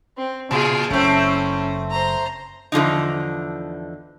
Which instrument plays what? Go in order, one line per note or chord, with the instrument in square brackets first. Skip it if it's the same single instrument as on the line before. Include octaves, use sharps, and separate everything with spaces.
[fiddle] C4
[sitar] A#2 [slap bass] C#3 [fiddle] F4 G#4
[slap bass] F#1 [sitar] A3 C4 [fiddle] C#4 E4
[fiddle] C5 A#5
[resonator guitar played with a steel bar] E2 D3 F3 D#4